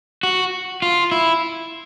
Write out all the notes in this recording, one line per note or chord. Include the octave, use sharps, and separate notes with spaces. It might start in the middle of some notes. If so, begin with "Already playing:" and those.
F#4
F4
E4